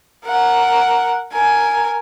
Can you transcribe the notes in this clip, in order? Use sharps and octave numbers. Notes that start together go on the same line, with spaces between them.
A#4 F#5
A#4 G#5